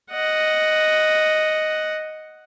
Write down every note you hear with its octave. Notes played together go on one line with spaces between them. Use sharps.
D#5 F#5